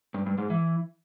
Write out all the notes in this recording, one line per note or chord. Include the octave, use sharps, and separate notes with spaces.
G2
G2
G#2
E3